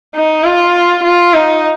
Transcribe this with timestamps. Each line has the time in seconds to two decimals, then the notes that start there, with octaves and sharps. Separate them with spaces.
0.15 D#4
0.44 F4
1.04 F4
1.34 D#4